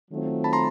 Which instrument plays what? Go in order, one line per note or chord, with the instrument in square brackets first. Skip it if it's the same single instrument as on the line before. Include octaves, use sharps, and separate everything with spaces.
[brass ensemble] D#3 F#3 A3 C4 F4
[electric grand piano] A5 B5
A#5 C6